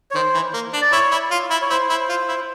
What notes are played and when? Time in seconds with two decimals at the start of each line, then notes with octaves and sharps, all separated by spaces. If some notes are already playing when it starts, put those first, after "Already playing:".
0.11 C#5
0.15 D#3 C5
0.34 E3
0.54 A#3
0.74 D4
0.81 D5
0.92 E4 C#5
1.11 E4
1.31 F4
1.50 E4
1.62 C#5
1.70 E4 C5
1.89 E4
2.09 F4
2.28 E4